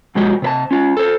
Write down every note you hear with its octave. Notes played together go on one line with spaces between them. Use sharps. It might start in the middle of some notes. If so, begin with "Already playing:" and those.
B2 F3 G#3 F#4 G4
C3 B4 A5
C#4 F4
A4 C5